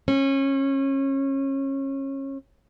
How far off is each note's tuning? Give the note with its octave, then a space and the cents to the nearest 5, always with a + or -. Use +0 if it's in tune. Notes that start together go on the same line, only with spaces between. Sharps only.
C#4 -25